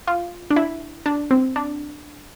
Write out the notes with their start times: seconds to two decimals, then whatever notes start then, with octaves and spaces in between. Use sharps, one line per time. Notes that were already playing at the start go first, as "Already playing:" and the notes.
0.07 F4
0.50 D4
0.56 E4
1.06 D4
1.31 C4
1.56 D4